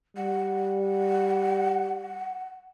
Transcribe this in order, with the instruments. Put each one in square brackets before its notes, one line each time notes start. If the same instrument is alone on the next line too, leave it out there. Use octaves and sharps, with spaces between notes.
[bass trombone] G3 [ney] F#5